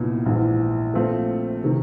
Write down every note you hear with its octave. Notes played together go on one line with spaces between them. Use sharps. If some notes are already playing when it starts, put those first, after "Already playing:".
Already playing: C2 A#2 F#3 B3 D#4
A#1 G#2 E3
A#2 F3 A3 C4 F4
C3 D#3